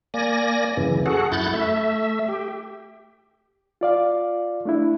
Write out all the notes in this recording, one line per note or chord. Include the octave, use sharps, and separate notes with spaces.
A#3 D5 G#5 A#6
F#2 C#3 E3
F#4 G#4 A4 F#5
F#2 E4 F#6 G6 A6
A3 E5
G4
F4 D5 F5
A3 D4 E4